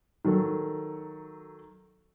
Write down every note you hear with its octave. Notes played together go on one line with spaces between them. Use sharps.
D#3 F#3 A4